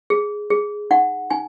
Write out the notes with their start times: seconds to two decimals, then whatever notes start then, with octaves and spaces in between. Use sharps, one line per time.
0.10 G#4
0.50 G#4
0.91 D#4 F#5
1.30 D#4 G#5